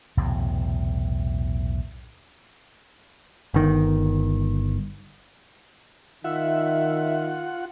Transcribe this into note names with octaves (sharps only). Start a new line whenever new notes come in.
B1 E2 A2 C3
G1 D#3
D#3 F4 E5 F#5